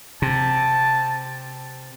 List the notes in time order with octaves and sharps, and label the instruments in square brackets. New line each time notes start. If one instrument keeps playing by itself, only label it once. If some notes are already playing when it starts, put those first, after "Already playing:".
[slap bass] C3 [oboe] A5